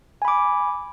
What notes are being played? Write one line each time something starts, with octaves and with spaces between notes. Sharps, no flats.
G#5 B5 D6